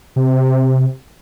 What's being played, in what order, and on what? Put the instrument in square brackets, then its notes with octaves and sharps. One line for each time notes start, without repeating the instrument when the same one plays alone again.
[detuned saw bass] C3